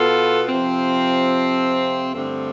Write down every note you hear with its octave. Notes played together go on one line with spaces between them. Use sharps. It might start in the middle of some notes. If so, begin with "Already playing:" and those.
Already playing: B2 B3 F4 A4
F2 C3 F3 C4
G2 D3 A3 C4